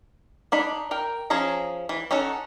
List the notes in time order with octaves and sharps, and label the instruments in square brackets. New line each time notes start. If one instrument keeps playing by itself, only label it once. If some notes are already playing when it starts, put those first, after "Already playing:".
[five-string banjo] D4 D#4 B5
A#4 G5
F3 C#4 G#4 A#5
E3
C#4 D#4 F#4 A4